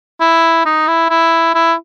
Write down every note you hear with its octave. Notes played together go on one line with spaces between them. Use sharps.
E4
D#4
E4
E4
E4